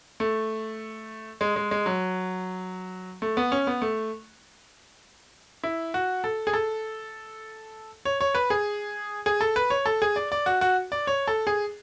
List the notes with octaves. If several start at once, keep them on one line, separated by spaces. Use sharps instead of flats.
A3
G#3
G#3
G#3
F#3
A3
B3
C#4
B3
A3
E4
F#4
A4
G#4
A4
C#5
C#5
B4
G#4
G#4
A4
B4
C#5
A4
G#4
D5
D5
F#4
F#4
D5
C#5
A4
G#4